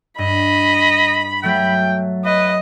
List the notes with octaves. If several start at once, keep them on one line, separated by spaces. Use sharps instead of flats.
G2 D#5 B5
F#3 A3 G5
B4 D#5